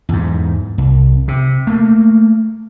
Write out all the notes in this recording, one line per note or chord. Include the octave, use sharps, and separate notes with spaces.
E2 G#2
C2
C3
A3 A#3